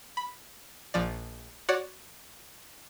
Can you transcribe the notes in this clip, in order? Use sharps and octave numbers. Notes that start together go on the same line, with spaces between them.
B5
A#1 F3 D5
F#4 C#5 D5 F#5